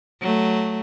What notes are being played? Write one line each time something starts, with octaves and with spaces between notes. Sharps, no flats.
F#3 A3